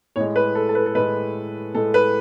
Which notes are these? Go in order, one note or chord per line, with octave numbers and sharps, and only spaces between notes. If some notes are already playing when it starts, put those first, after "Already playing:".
A2 G#3 C#5
B4
A4
A4
B4
A4
A2 G#3 B4
A2 G#3 A4
B4